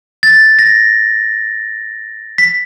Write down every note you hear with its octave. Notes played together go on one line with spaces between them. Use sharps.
A6
A#6
B6